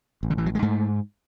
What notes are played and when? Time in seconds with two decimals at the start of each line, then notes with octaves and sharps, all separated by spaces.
0.23 A1
0.30 D3
0.38 E3
0.46 F#3
0.55 G#3
0.62 G#2 A3